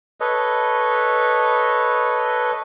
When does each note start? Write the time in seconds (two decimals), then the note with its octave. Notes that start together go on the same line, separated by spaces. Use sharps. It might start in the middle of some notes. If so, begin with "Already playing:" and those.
0.20 A4 B4 C#5 D#5